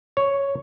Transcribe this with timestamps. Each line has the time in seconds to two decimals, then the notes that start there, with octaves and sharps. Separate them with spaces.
0.17 C#5